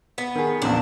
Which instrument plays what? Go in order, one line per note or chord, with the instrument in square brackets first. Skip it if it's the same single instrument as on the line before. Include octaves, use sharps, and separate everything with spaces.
[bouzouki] B3
[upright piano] D#3 G#4
[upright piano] A#1 E2 C#3 [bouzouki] D4